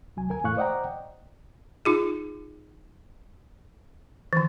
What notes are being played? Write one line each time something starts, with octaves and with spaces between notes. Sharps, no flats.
C2 F#3 G#5
D2 A#4 G#5
E2 A2 F5 C#6 F#6
C5 D5 D#5 F#5 G5 A#5
D#4 F4 G#4
D#3 E3